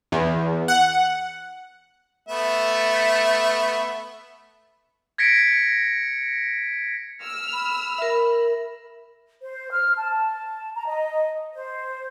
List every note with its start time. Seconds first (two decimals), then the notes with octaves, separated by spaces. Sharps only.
0.12 E2
0.68 F#5
2.29 A3 B3 E5
5.18 G#6 A#6 B6 C#7 D7
7.23 E6 F6
7.53 B5
7.98 A#4 E5
9.42 C5
9.71 F6
9.97 A5
10.76 A#5
10.87 D#5
11.54 C5